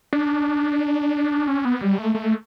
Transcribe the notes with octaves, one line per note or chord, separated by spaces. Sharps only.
D4
C#4
B3
G3
A3
A3